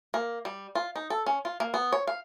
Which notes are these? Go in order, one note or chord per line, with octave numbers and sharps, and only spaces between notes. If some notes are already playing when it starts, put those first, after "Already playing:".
A#3
G3
F4
D#4
A4
C#4
F4
A#3
B3
C#5
F5